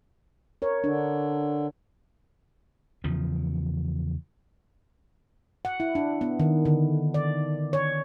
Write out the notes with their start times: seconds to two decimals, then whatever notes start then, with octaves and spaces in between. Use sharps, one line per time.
0.62 A#4 C#5
0.84 D3 D4
3.04 E2 C#3 F3
5.65 F#5
5.80 E4
5.95 D4
6.21 B3
6.39 D#3
6.65 D3
7.14 D5
7.73 C#5